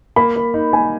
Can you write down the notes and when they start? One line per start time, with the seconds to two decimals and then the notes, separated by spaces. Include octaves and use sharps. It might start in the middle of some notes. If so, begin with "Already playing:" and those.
0.16 A#3 B5
0.36 A#3
0.54 D#4
0.73 A#3 G#5